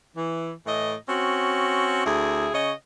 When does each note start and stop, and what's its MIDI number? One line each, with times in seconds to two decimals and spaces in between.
0.17 0.52 52
0.66 0.94 45
0.66 0.94 52
0.66 0.94 75
1.09 2.02 60
1.09 2.02 61
1.09 2.02 66
2.06 2.49 38
2.06 2.49 64
2.06 2.49 68
2.54 2.73 49
2.54 2.73 73
2.54 2.73 75